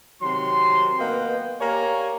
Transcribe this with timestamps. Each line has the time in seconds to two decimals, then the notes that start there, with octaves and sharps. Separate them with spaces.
0.22 C3 D#3 F#3 C6
0.99 A#3 B3 B4 D#5 F#5 G5
1.60 A#3 G4 C#5 D5 G#5 A#5